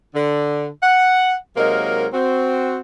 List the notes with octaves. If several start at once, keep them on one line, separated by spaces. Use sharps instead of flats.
D3
F#5
C3 F#3 G#3 A#3 D#4 A#4
C4 F#4